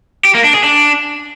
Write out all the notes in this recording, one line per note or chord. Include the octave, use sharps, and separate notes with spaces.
G4
A#3
D4
G#4
D4